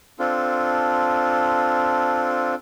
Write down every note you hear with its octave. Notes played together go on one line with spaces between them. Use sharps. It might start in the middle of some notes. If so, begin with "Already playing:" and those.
C4 D4 F4 A4